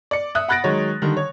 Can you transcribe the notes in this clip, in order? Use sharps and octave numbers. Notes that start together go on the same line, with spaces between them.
D5 C#7
E5 D#6 F#6
F#5 B5 F#6 A6 A#6 D7
D#3 F#3 G#3 C#5
D3 D#3 G3
C#5